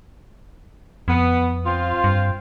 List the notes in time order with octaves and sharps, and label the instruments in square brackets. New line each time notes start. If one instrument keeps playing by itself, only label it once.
[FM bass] F2 [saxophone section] B3
[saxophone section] C4 F4
[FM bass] G2